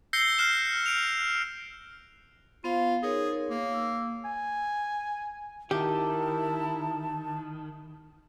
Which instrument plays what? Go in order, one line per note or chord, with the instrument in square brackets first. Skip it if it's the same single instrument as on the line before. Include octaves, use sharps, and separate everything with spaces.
[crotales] E6 G6 A#6 C7 C#7 G7
F6 F#6 C7 E7
D7 F7
[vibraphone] B3 C5 F5 [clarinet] F4
[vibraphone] D#4 A#4 C#5 [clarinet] G#4
[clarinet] A#3
[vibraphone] E6
[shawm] G#5
[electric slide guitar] D#3 [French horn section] E4 A#4 [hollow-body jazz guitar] G4 [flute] A5